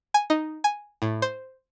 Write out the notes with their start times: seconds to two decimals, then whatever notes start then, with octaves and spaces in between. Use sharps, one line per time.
0.14 G#5
0.30 D#4
0.64 G#5
1.02 A2
1.22 C5